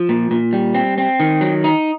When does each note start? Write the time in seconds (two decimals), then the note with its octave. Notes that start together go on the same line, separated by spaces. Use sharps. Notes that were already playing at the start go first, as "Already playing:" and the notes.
Already playing: F3
0.09 A#2
0.31 A#2
0.53 G3
0.75 C4
0.98 C4
1.20 D#3
1.41 F#3
1.64 D#4